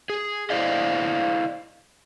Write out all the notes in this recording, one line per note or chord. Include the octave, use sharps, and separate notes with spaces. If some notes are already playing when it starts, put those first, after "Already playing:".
G#4
E4 C5 D5 D#5 F5